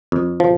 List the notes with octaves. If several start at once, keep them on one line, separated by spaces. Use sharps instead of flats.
F2
F3